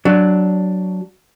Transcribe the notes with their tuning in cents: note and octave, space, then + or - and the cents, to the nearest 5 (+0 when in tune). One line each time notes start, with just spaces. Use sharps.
F#3 +10 D4 +0